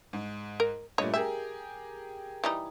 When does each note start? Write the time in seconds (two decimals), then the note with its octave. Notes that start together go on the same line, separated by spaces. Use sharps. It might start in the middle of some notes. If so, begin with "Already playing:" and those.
0.13 G#2
0.60 A#4
0.98 G2 A#2 A3 C#5 D#5
1.14 G4 G#4 A#4 E5
2.44 E3 G3 D#4